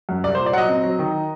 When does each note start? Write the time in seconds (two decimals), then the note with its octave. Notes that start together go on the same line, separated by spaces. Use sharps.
0.09 F#2
0.24 C2 D5
0.35 A#2 C5
0.46 D5
0.53 F#3 F#5
0.58 D#5
0.69 C4
0.84 F#3
0.99 D#3